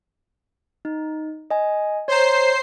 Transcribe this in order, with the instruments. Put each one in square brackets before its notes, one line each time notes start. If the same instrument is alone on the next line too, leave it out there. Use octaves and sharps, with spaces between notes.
[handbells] D#4
D#5 G#5
[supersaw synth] C5 C7 [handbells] C#5 A#5